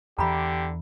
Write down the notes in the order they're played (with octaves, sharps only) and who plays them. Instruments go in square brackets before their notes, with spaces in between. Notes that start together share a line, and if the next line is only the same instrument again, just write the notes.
[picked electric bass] E2 E3 [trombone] D3 [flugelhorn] G4 [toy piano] A#5 B5